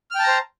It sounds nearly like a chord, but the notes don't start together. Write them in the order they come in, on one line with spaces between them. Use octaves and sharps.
F6 G5 A5 A#5 C5